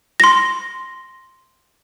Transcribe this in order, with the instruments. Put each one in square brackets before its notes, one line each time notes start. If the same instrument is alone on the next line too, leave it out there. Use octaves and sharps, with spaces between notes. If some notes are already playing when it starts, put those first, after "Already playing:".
[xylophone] C6 A#6